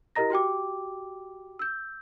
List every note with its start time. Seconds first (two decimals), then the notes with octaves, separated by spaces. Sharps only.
0.15 E4 G4 A#4 D#5 A#5 A#6
0.30 F#4 G4 G5 D6
1.59 E6 G6